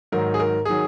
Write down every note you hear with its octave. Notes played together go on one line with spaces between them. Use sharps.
G#2 D#3 F#3 A#4
G#4
A#4
D#3 F#3 G#4